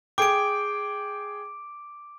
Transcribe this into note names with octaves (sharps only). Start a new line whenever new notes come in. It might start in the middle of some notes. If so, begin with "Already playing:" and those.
G#4 G5 D6 D7